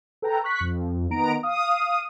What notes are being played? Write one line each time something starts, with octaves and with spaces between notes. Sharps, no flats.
A4 B4 G5 A#5
C#6 F#6 B6
F2
D#3 B3 A#5 D7
F5 D#6